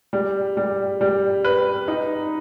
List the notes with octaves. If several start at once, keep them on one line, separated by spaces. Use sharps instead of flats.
G3
G3
G3
B4
D#4